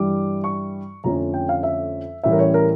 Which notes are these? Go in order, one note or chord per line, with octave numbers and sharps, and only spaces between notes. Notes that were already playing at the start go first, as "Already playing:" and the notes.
Already playing: G2 E3 G3 D6
C#6
F2 D3 F3 A3 C#4 A#5
G5
F5
E5
A1 A2 E3 G3 C#4 E5
A#4
C#5
A#4